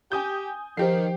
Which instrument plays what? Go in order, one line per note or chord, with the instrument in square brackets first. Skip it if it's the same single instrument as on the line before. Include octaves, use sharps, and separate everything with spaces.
[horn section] G4 [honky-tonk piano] G#5 D#6 G6
[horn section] D#3 [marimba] F3 C5 [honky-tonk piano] G4 C7